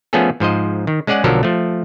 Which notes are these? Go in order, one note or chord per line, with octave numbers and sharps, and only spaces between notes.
F3 A3 B3 C#4 G#4 A4
G#2 F3 C5 D#5
D#3
G#3 C#4 G#4 D5 F#5
B1 D3 F3 F#3 A4 A#4
F3 A3